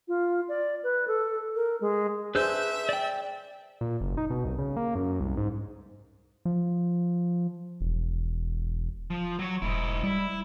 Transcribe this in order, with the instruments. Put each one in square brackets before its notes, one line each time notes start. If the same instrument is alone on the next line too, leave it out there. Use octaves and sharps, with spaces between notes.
[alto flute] F4
D5
B4
A4
A#4
G#3
[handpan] D4 G#4 C5 [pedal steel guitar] B4 E6 G6 [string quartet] E5
[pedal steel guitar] D5 G5
[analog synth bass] A#2
F#1
D#4
B2
C2
C#3
A#3
F#2
C2
G#2
F3
E1
[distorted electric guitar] F3
F#3 C#5
[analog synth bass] E1 [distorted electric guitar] G#2 E4
[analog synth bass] G3 [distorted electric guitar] E4